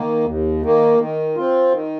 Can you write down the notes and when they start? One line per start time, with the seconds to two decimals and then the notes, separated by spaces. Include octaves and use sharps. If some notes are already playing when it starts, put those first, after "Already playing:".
Already playing: D#3 A#3
0.25 D#2
0.62 D#3 A#3
0.99 D#3
1.36 C4 F4
1.72 D#3